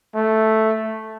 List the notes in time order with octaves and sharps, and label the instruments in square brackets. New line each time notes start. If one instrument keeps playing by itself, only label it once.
[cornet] A3